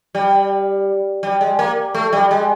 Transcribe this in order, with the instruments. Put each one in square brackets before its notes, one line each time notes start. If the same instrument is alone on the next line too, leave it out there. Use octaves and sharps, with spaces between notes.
[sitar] G3
G3
G#3
A#3
A3
G3
G#3